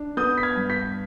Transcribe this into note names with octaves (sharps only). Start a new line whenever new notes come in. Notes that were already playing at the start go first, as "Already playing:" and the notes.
Already playing: D4
B3 D#6 G6
B6
F6 G#6
G2
G6 B6